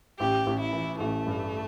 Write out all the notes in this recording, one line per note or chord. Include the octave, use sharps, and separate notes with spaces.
A1 G4
A1
E4
E3
A1 A3
G2